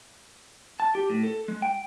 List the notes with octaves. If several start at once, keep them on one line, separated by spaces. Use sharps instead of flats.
A5
G4
A2
A4
G#3
G5